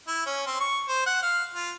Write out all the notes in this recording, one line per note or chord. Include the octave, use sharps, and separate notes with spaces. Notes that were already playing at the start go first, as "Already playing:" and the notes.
E4
C#4
C4
C#6
C5
F#5
F5
F4